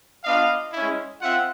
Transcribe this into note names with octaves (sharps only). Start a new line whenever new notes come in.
B3 D4 F4 D#5 F5
G#3 C#4 E4
C4 F4 E5 F#5